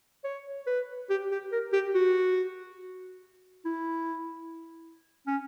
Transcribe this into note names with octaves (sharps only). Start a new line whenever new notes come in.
C#5
B4
G4
G4
A#4
G4
F#4
E4
C#4